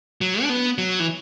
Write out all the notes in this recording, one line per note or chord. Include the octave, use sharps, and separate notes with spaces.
F#3
D4
B3
F#3
E3